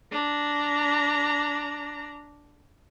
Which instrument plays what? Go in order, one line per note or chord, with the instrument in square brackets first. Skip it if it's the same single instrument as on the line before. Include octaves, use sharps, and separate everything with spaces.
[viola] D4 A#5